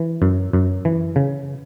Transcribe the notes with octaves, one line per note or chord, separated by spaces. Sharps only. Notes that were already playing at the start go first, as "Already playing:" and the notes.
Already playing: E3
F#2
F#2
E3
C#3